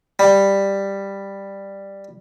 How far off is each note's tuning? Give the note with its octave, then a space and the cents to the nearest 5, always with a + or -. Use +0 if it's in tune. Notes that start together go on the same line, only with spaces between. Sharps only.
G3 +5